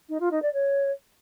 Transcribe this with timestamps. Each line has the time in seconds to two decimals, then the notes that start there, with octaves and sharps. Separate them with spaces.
0.09 D#4
0.20 F4
0.31 D#4
0.42 D5
0.53 C#5